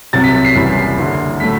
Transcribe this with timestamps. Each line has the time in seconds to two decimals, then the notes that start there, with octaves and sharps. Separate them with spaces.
0.13 C2 C3 F#3 A6
0.24 B6
0.35 B6
0.45 C7
0.55 F#1 F#2 E3 G3
0.97 F#1 F#2 D3
1.40 A2 F#3 A3 B6